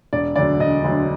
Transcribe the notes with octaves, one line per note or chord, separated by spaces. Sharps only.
E1 D5
D2 D3 F#3 D5
E1 D#5
D2 D3 F#3